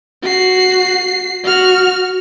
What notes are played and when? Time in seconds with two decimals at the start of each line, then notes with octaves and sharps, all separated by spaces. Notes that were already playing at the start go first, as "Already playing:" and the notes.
0.22 F#4 C7
1.44 F#4 F6